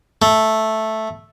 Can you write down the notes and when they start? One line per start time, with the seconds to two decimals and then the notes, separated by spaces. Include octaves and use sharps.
0.22 A3